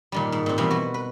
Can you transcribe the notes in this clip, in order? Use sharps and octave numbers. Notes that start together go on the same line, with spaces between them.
A#2 D#3 G3
G#2
A#2 C4
B2 E3 F3 G3 C4
F#4 B4
B4